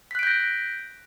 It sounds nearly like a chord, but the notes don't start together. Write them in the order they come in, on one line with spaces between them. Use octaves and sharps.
B6 F#6 D7 G6 A#6